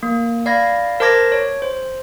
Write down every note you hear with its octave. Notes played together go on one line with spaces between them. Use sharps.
A#3
D5 F5 B5 G#6 A#6
A#4 C5 A5 D6 G#6 A#6
C#5
C5